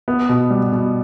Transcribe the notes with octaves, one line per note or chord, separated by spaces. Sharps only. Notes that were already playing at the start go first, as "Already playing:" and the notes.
B3
B2
G3
B2